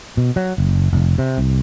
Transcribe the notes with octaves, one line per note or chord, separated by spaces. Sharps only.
B2
F#3
F#1
F1
C3
C2